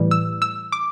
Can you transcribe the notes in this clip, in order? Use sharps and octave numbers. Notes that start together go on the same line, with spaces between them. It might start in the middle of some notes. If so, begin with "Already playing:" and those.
Already playing: A2 E3 G3
E6
E6
D6